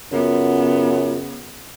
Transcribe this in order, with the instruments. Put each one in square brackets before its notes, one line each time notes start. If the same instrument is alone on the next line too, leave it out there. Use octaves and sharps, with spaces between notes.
[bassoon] F#2 [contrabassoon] C#3 [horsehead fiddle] B3 [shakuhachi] F4